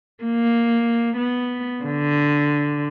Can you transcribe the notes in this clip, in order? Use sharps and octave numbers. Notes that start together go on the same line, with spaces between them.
A#3
B3
D3